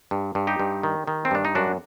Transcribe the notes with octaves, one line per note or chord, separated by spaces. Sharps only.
G2
G2
D#4 G4
G2
D#3
D#3
C4
G2 D4
D#4
F#2 D4 F#4